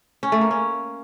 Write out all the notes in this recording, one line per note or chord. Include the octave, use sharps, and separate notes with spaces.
C#4
A3
A#3
C#4